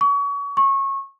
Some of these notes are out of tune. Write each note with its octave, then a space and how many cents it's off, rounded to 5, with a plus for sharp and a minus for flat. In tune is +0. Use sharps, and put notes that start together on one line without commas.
C#6 +30
C#6 -25